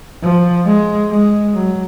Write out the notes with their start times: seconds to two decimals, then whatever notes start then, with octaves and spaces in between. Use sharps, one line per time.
0.22 F3
0.66 G#3
1.10 G#3
1.54 F#3